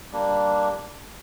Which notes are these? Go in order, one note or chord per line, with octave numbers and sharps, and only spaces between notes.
G3 A#3 D4